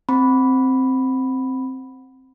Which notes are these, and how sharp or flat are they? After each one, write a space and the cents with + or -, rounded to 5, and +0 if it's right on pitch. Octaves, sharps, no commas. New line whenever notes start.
C4 +0 B5 +0